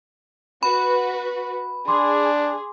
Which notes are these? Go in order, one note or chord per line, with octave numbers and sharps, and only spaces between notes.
F#4 B4 B5
D4 G#4 C6 D6